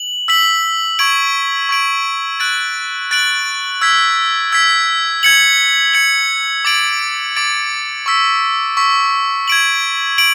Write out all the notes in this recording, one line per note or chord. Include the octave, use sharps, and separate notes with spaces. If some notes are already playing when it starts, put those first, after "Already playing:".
Already playing: F#7
E6 B6 F#7
C#6 G#6 D7 F#7
C#6 G#6 D7 F#7
F#6 A6 D7 F#7
F#6 A6 D7 F#7
E6 G#6 B6
E6 G#6 B6
G#6 C#7 F#7
G#6 C#7 F#7
D6 A6 D7 F#7
D6 A6 D7 F#7
C#6 E6 B6
C#6 E6 B6
G#6 D7 F#7
D7 F#7